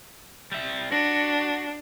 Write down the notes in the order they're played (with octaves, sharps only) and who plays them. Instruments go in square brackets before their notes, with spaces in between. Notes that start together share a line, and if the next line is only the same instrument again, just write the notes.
[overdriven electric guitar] G3 E5
[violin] D4 [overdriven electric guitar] F#4